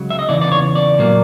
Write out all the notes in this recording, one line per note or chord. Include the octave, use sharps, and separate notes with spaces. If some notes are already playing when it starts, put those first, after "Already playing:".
Already playing: C#2 C#3 F#3
E5
D#5
E2 C#3 E3 D5
D5
C#5
D5
A#2 F#3 A#3